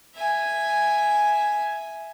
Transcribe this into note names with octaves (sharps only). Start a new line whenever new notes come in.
E5 G#5